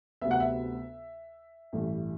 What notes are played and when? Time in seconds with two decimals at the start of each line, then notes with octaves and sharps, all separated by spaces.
0.22 D2 C3 F#3 B3 E5
0.31 F#5
0.40 E5
1.73 A1 G2 E3 A3